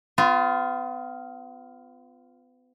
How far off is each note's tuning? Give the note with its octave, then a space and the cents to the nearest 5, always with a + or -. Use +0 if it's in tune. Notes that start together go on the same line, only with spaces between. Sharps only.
B3 +40 F4 +0